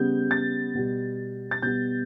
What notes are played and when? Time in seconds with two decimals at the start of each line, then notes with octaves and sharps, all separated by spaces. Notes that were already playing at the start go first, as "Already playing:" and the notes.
Already playing: C#3 G3 B3 G6
0.31 A6
0.75 B2 G3 B3
1.51 A6
1.62 B2 G3 B3 G6